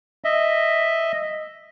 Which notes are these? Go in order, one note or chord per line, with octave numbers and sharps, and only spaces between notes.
D#5 E5